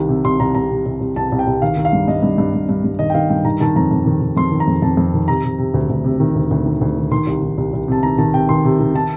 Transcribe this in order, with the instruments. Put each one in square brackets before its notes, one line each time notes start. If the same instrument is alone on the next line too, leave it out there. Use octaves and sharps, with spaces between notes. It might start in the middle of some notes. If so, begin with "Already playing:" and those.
Already playing: [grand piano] C2 D#3
C3
C2 C6
C2 A#5
C2 A#5
C3
C2
C2
C2 A5
C2
G5
C2
D#3 F5
D#3
F5
G2
G2 D#5
G2
G2
G2
G2
G2
D#3 D#5
G5
D#3 F5
G2 G5
D#3 A#5
D#3 A5
F2 A#5
F2
D#3
D#3
F2 C6
D#3
A#5
F2
F2 A5
F2
D#3
C3 A#5
C3
C3
D2
D2
C3
D#3
D2
D2
D#3
D2
D#3
D#3 C6
C2
D#3
C2
C2
C3 A5
D#3 A#5
D#3 A5
C3 G5
D#3 C6
C3
D#3
D#3 A5